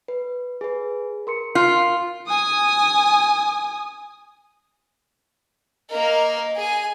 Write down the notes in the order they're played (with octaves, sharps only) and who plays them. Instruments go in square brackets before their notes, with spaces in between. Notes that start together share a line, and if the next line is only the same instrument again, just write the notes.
[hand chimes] B4
G#4 B4
A#4 C6 C#7
[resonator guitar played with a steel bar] F4
[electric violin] G#5 D#6
[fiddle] A#3 A#4 [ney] D#5
[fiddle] G#4 G#5